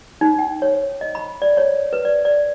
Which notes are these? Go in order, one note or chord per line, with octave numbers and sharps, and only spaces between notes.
D#4
G5
C#5
D#5
B5
D5
C#5
B4
D5
D5